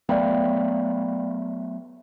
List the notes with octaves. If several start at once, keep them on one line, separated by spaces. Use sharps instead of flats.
F#3 A3 B3 D5 F5 G5